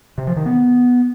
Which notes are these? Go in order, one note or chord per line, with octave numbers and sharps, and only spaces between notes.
C3
F3
D#3
B3